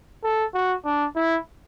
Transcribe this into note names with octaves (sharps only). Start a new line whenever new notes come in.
A4
F#4
D4
E4